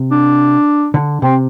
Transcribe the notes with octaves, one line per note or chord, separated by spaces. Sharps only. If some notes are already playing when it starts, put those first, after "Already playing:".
Already playing: C3
D4
D3
C3 C4